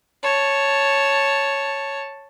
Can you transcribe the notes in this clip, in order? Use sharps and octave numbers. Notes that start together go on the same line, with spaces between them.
C#5 A5